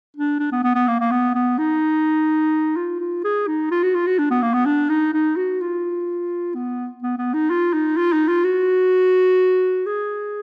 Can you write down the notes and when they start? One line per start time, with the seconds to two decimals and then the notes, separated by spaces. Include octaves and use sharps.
0.17 D4
0.39 D4
0.52 B3
0.64 B3
0.75 B3
0.88 A#3
1.00 A#3
1.11 B3
1.35 B3
1.58 D#4
2.76 F4
3.00 F4
3.24 G#4
3.47 D#4
3.71 F4
3.83 F#4
3.95 F4
4.07 F#4
4.19 D4
4.30 B3
4.42 A#3
4.54 B3
4.66 D4
4.89 D#4
5.13 D#4
5.37 F#4
5.61 F4
6.55 B3
7.03 B3
7.18 B3
7.34 D#4
7.50 F4
7.73 D#4
7.97 F4
8.13 D#4
8.28 F4
8.44 F#4
9.86 G#4